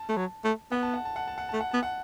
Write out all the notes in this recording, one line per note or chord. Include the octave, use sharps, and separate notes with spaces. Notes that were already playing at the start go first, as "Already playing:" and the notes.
Already playing: A5
A3
F#3
A3
B3 F#5
A5
F#5
A5
F#5
A5
F#5
A3 A5
F#5
B3 A5
F#5